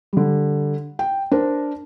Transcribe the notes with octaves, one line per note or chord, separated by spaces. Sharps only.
D3 G3
G5
D4 A#4 C5